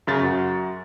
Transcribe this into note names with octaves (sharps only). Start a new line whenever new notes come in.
F#2 C#3 A6
F#2 F#4